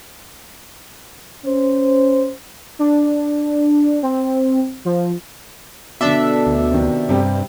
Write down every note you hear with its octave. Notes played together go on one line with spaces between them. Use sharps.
C#4 C5
D4
C4
F3
B2 D3 D4 A4 E5 D6
D2
C3 D#3
G2 C3 G3 G4